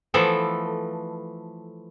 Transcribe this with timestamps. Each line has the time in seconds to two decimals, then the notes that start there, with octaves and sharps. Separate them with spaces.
0.14 E3 F3 A3 B3 A4